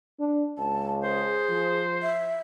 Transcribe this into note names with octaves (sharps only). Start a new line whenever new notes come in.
D4
C#2 A5
G#4 C5
F3
E5